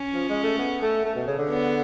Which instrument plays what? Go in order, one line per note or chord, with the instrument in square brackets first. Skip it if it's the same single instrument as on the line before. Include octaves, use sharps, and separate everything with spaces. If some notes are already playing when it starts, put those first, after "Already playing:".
Already playing: [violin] C#4
[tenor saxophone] F3
G#3
A3
B3
A3
A3
B2
C#3
D3
[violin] B3